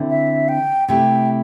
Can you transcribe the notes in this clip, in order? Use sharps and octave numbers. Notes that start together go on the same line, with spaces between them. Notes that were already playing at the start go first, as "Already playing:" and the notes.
Already playing: D3 C4 E4
E5
G5
C3 A3 E4 G4 G5